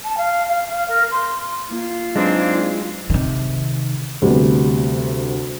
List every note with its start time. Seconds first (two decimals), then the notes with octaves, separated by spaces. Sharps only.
0.04 A5
0.17 F5
0.48 F5
0.69 F5
0.88 A#4
1.11 C6
1.70 A#3 F4
2.16 G#2 F#3 G#3 C4 D4 B4 F#5
3.10 C3 D#3
4.22 D2 C3 G3 B3